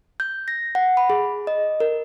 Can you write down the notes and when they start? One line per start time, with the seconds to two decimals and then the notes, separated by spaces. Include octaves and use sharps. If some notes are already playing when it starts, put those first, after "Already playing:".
0.20 G6
0.48 A#6
0.75 F#5
0.97 B5
1.10 G#4
1.47 D#5
1.80 A#4